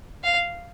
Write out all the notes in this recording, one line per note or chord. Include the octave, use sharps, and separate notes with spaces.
F5